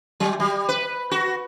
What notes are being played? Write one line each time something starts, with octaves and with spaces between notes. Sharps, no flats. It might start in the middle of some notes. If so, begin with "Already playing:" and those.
F#3
G3
B4
F#4